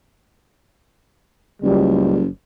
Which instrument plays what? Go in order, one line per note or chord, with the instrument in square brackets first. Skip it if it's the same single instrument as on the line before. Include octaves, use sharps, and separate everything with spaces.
[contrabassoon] F#1 [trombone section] C#2 G3